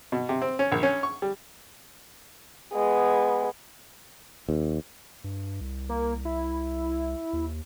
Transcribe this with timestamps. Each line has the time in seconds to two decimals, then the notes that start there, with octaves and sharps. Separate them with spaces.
0.12 B2
0.29 C3
0.42 C4
0.59 C#4
0.72 A#1
0.83 C#4
1.03 C#6
1.22 G3
2.74 G#3 B3
4.49 D#2
5.24 G2
5.61 C2
5.89 A#3
6.25 E4
7.33 D#2